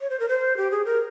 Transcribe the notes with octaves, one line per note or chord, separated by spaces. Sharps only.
C#5
C5
A#4
C5
G4
G#4
A#4